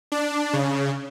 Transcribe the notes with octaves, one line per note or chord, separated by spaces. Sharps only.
D4
C#3